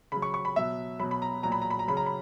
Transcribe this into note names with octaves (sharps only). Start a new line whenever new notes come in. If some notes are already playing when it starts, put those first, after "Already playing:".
C#3 F#3 B5
C#6
C#6
B5
B2 F#3 E5
B2 F#3 B5
B5
A#5
A#2 F#3 A#5
B5
A#5
B5
A#5
C#3 F#3 B5
A#5
B5